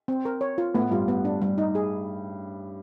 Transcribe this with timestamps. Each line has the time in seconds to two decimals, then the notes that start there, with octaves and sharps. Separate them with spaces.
0.08 C4
0.25 A#4
0.41 C#5
0.58 F4
0.74 A2 B3
0.91 G2 F4
1.08 B3
1.25 D4
1.42 G3
1.58 D#4
1.75 G#4